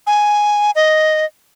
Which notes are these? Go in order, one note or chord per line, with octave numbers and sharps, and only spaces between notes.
G#5
D#5